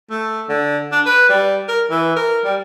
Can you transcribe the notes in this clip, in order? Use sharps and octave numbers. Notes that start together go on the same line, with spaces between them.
A3
D3
D4
B4
G3
A#4
E3
A#4
G3